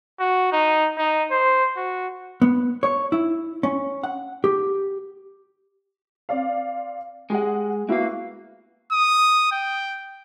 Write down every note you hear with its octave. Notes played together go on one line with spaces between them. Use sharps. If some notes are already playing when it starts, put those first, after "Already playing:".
F#4
D#4
D#4
C5
F#4
B3
C#5
E4
C#4
F#5
G4
C4 D5 F5
G#3 G4 G#4 F#5
A#3 B3 E4 F#4 F5
D#6
G5